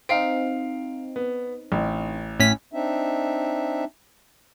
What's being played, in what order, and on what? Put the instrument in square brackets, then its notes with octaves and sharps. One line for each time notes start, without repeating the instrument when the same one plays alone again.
[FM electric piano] C4 D#4 [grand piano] F5 C7 D7
[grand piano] B3
A1
[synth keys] A2 C#4 B6
[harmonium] C4 D4 D#4 E5